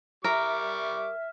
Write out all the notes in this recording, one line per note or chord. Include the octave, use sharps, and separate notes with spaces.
G3 A#4 E5 C#6 D6 F6